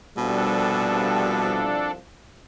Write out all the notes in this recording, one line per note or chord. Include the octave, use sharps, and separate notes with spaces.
C2 B2 F3 G3 D4 A4